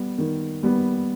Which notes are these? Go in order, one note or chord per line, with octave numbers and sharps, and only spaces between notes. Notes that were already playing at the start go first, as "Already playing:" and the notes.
Already playing: G3 B3
D#3
G3 B3